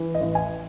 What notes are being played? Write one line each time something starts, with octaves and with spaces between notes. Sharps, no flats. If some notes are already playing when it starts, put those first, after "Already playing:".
Already playing: E3
D#5
A1
G#5